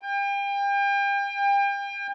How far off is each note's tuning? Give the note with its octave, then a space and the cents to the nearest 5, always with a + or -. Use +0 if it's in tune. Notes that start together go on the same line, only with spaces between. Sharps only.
G5 +35